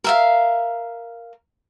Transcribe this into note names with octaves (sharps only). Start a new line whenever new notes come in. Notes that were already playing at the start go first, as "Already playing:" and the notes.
A#4 E5 F5